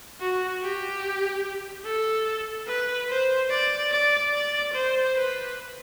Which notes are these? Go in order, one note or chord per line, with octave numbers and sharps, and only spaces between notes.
F#4
G4
A4
B4
C5
D5
D5
D5
C5
B4